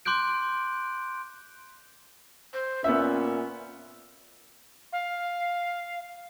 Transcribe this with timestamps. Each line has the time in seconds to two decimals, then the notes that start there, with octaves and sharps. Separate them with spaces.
0.05 C6 D6 F#6 G6 D7
2.53 C5
2.84 A#2 B3 C#4 E5
4.93 F5